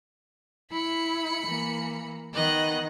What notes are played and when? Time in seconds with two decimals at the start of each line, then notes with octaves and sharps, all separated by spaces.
0.72 E4 B5 C#7
1.44 E3 A#3
2.34 D#3 B3 D#5 F#6